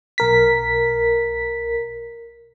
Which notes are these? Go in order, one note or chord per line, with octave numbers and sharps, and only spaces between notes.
B1 A#4 B6